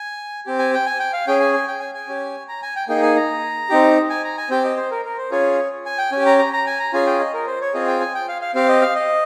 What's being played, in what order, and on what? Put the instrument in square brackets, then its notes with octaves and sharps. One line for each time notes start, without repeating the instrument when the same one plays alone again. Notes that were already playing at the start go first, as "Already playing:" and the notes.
Already playing: [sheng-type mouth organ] G#5
C4 G4
G#5
G5
G#5
G5
F5
C#4 G#4 G5
G#5
G#5
G5
G#5
G#5
C#4 G4
A#5
G#5
G5
A#3 D#4 G#4 G5
G#5
A#5
C4 D#4 G4
G#5
A#5
G#5
C4 G4 G5
D#5
C5
A#4
A#4
C5
C#4 F4 G#4 C#5
G#5
G5
C#4 G#5
G4
A#5
A#5
A#5
G#5
A#5
C#4 F4 G#4 G#5
G5
D#5
A#4
C5
C#5
C4 F4 G#4 D#5
G5
G#5
G5
F5
F5
C4 G4 F5
D#5
F5
D#5